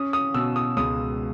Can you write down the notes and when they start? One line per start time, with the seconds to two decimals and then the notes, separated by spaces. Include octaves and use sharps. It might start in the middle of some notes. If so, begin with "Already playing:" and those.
Already playing: C#4 D#6
0.13 D#6
0.34 B2 E6
0.56 D#6
0.77 C#2 D#6